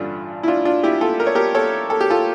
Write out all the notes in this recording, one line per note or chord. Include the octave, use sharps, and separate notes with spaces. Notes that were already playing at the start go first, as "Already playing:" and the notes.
Already playing: A1 G2 D3 D4 F4
E4
D4 F4
D4 F4
E4 G4
F4 A4
A#4
C#5
G4 A#4
A4 C#5
A4
G4
F4 A4